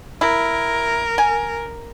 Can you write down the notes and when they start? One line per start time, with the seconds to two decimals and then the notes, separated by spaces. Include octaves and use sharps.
0.21 E4 A#4
1.18 G#5